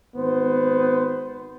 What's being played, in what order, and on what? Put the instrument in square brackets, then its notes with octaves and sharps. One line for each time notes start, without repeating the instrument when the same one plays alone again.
[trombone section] G#1 B3 C5